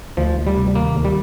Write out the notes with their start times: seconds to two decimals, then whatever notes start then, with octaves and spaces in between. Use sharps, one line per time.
0.17 D2 F3
0.36 D2
0.47 G3
0.57 C3
0.75 D#3 A#3
0.95 D2
1.05 G3